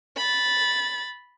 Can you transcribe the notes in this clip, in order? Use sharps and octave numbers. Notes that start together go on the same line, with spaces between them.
B5 A6